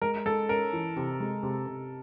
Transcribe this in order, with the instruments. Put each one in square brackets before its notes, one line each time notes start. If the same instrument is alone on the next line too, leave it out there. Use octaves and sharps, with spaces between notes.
[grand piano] G#3 [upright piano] A#4
[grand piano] G#3 [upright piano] A4
[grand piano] C#4 [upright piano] A#4
[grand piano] E3
C3
G#3
C3
C3